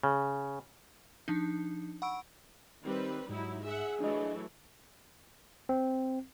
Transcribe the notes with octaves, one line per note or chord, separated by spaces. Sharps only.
C#3
F3 D4 D#4
F#5 B5 C#6 E6 D7
D#3 G3 C4 B4
G#2 F#3 D#4 E4
G#4 E5 F#5
E3 F#3 A3 D4 D#5
C4